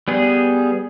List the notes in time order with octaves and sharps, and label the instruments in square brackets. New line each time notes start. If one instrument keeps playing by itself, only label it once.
[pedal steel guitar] G3 B3 G#4